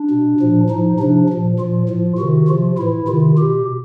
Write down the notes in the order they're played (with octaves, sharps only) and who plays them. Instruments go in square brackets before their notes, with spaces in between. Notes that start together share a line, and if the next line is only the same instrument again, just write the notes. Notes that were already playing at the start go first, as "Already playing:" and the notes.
Already playing: [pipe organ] D4
B2
A#2 F3
A2 F3 D#4
C3 F3 D4
A#2 F3
A#2 F3 F4
A2 F3
C3 D#3 F#4
C3 F3 F4
A2 E3 E4
C3 D#3 F4
B2 G4